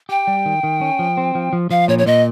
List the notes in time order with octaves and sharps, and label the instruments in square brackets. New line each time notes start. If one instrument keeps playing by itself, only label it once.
[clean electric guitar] G4 [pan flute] G5
[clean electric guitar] G3
D#3
D#3
C#4
F3
C4
F3
F3
[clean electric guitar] F3 [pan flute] F5
[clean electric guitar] A#2 [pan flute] C#5
[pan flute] C#5
[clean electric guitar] A#2 [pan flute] D#5